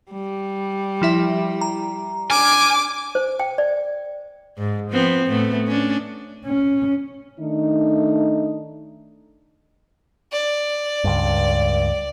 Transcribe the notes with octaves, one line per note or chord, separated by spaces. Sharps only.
G3
F3 E4 E5
A#5
D4 G#5 D6 F6
C5
G5
D5
G#2
F3 B3 C4
A2 A3 B3
C#4 D4
C#4
D#3 A3 D4 D#4
D5
C#2 G2